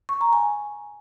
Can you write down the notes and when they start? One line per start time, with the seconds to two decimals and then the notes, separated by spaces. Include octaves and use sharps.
0.09 C#6
0.21 A#5
0.33 G#5